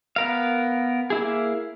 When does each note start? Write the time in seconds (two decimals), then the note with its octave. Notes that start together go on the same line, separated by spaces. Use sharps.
0.16 B3 A#4 F5
1.10 A#3 E4 G#4